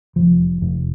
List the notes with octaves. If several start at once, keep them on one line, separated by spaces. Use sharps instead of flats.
F1 F3
F1